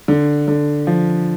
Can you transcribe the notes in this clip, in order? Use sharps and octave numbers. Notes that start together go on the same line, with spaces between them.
D3
D3
F3